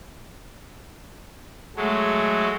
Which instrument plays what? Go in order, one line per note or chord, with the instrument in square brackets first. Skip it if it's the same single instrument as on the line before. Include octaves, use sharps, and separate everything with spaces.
[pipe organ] F#3 G#3 A3